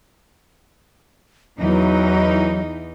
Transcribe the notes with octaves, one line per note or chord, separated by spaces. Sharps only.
E2 E3 F#3 D#4